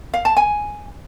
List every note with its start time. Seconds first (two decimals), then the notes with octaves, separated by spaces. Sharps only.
0.14 F5
0.25 A5
0.37 G#5